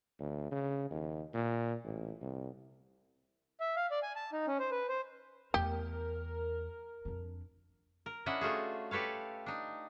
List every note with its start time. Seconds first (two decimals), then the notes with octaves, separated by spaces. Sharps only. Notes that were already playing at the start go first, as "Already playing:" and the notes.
0.20 D2
0.52 C#3
0.91 D#2
1.34 A#2
1.84 A1
2.22 C2
3.60 E5
3.76 F5
3.91 D5
4.03 G#5
4.16 A5
4.33 D#4
4.48 C#4
4.59 C5
4.71 B4
4.88 C5
5.54 E2 A3 G4 A#4
7.05 F2 D4
8.06 A#4
8.26 C#4 D4 E4 D#5 E5 F#5
8.41 A3 F4 F#4 G#4
8.91 G4 A4 B4 C#5 F5
9.46 D4 D#4